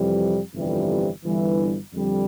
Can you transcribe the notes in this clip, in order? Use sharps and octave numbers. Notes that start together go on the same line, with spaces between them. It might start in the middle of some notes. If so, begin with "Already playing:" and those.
Already playing: F2 C3 E3 G3
G1 F2 C3 E3 G3
G1 G2 E3 G3
F2 D3 G3